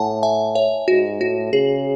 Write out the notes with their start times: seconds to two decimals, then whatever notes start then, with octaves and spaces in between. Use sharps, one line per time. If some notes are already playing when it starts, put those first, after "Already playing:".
Already playing: A2 F#5 G#5 A5
0.23 E5 G#5
0.55 C#5 E5
0.88 G#2 F#4
1.20 A2 F#4
1.53 C#3 G#4